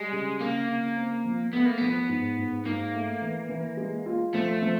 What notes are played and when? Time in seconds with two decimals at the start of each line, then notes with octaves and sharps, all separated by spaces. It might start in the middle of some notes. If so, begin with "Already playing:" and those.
Already playing: G3 G#3
0.12 C#3
0.41 C#3 A#3
0.68 C#3
0.96 C4
1.25 F3
1.53 A3 B3
1.65 A#3
1.78 F3 B3
2.09 G#2
2.38 G#2
2.66 G#2 A#3
2.94 A3
3.21 E3
3.49 E3
3.77 G#3
4.06 F4
4.34 F3 A3
4.62 F3